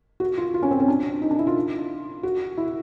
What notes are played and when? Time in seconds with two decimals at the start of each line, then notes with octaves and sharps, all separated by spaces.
0.20 F#4
0.37 F4
0.54 F4
0.63 C#4
0.71 C4
0.80 C#4
0.88 D4
1.22 D#4
1.31 D4
1.39 E4
1.47 F4
2.23 F#4
2.58 E4